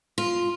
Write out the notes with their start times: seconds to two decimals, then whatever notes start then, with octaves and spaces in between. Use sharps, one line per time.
0.18 F4